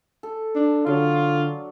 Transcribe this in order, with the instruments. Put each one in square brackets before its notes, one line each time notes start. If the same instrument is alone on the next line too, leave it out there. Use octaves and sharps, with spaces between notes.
[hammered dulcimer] A4
[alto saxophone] D4
[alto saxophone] D3 [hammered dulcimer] F#3 D4 [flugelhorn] F4